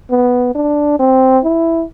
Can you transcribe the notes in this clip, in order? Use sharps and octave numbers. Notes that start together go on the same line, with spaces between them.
B3
D4
C4
E4